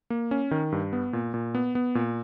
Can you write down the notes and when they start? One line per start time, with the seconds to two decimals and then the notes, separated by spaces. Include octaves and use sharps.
0.10 A#3
0.31 C#4
0.51 D#3
0.72 G2
0.93 B3
1.13 A#2
1.34 A#2
1.55 B3
1.75 B3
1.95 A#2